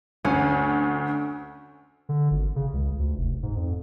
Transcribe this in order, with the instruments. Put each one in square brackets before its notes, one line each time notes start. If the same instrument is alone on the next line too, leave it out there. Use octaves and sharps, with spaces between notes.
[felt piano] D2 [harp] C#4
[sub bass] D3
G#1
C#3
C#2
D2
F1
G#2
F2